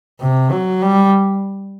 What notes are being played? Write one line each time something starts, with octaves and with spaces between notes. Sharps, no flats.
C3
F#3
G3